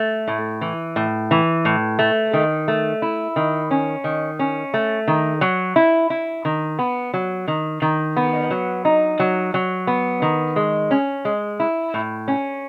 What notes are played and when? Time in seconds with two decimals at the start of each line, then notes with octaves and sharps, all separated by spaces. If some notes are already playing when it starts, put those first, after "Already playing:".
Already playing: A3
0.28 A2
0.61 E3
0.96 A2
1.31 E3
1.65 A2
1.99 A3
2.33 D#3
2.68 A3
3.02 E4
3.36 D#3
3.71 C#4
4.04 D#3
4.39 C#4
4.74 A3
5.08 D#3
5.41 F#3
5.76 E4
6.10 E4
6.45 D#3
6.79 B3
7.14 F#3
7.48 D#3
7.82 D#3
8.17 B3
8.51 F#3
8.85 D#4
9.20 F#3
9.54 F#3
9.87 B3
10.22 D#3
10.56 G#3
10.91 C#4
11.25 G#3
11.60 E4
11.94 A2
12.28 C#4